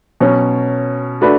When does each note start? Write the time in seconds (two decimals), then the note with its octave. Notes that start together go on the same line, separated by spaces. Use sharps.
0.20 B2 F#3 C#4
1.21 A3 D4 F#4 B4